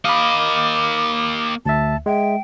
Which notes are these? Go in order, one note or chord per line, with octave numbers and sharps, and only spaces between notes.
A#3 D#5 F5 B5 D6
D2 E5 A5
G#3 E5 G5